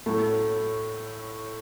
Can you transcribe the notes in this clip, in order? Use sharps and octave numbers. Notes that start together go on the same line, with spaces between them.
A2 F#3 A3 A4